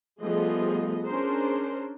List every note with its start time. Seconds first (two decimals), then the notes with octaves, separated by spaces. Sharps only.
0.22 F3 G3 A3 B3 G#4 D#5
1.07 C#4 D4 G#4 A#4 C5